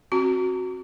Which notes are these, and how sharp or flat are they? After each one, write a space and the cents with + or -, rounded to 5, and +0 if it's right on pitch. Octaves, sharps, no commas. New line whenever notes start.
C4 +30 F#4 +0 A#5 -30